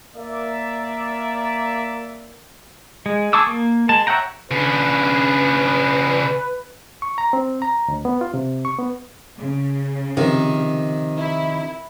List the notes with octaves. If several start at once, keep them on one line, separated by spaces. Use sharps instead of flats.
A#3 D5 E5
G#3
G#4 A5 C#6 D6 E6
A#3
G#3 A5
C#5 E5 F#5 G5 A#5
C#3 D4 B4
C#6
A#5
C4
A#5
D2
B3
F4
C3
C#6
B3
C#3
C3 D#3 F3
E4